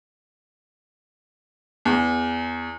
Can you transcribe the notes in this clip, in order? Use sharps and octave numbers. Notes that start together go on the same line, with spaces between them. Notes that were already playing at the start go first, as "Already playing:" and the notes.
E2